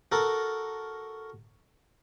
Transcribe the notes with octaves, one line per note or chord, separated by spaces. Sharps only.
F#4 A4 A#4